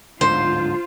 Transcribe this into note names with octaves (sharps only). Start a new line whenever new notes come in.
D1 G#2 D3 F4 C5